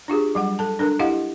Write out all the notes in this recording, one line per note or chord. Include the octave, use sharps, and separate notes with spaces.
D4 F4 G4 G#4
F#3 G3 F#5
A4 A5
D4 A4 A#4
E4 G4 D#5 F5 F#5